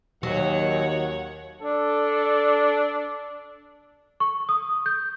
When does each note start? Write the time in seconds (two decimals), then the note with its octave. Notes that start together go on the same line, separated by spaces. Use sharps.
0.23 D#2 F#3 C#5 F#5
1.61 D4 A4
4.20 C#6
4.49 D#6
4.86 G6